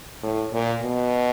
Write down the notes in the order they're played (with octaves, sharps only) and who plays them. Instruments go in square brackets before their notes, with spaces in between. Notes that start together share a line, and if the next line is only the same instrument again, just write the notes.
[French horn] A2
A#2
B2